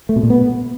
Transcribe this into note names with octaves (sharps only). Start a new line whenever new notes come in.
A3
B2
A#2
B3